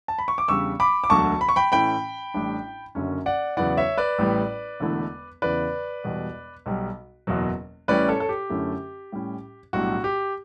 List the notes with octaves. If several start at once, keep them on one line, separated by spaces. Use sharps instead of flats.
A5
B5
C#6
D6
E2 C#3 G3 D4 C#6 E6
B5 D6
D6
E1 D2 D3 F#3 A5 C#6
B5
C#6
G5 B5
A2 E3 A3 C#4 E4 G5 B5
A1 A2 G3 D4
F#1 F#2 D3 F#3 C#4
D5 F#5
E2 C#3 F#3 B3 E4 D5 F#5
C#5 E5
B4 D5
A1 A2 G3 B3
E1 E2 D3 A3 E4
E2 C#3 E3 B4 D5
E1 E2 B2 G3
B1 B2 G3
F#1 E2 B2 F#3
A1 A2 G3 C#4 E4 B4 D5
A4 C#5
A4
G4
F#2 D3 A3 C#4 E4
A2 G3 C#4 E4
B1 A2 G3 D4 F#4
G4